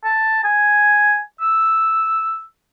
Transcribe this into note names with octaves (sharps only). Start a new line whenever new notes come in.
A5
G#5
E6